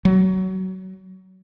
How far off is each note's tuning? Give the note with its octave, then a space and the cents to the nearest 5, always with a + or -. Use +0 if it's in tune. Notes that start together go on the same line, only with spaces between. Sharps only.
F#3 +20